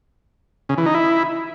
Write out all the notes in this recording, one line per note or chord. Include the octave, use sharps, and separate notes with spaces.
C#3
E3
D#4
E4